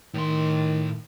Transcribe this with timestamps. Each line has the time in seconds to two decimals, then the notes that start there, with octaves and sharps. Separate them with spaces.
0.14 A2 D#3 C6